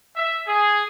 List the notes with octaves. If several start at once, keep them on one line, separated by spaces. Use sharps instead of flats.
E5
G#4